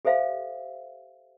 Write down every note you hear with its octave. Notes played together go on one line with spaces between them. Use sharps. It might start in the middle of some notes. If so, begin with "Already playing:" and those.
G4 A4 C5 E5 F5